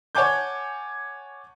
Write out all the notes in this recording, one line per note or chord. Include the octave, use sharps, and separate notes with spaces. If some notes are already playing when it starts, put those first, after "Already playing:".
C#5 F#5 G#5 A5 D6 G6